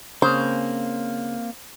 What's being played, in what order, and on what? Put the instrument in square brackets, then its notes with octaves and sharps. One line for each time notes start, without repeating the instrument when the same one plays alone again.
[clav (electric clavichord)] C#3 [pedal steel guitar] A#3 C4 [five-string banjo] C5